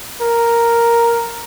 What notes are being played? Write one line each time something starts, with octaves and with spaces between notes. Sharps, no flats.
A#4